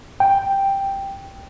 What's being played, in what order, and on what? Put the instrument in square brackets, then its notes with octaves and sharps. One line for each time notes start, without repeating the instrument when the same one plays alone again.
[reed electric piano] G5